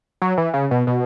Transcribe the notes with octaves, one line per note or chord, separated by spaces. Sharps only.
F#3
E3
C#3
B2
B2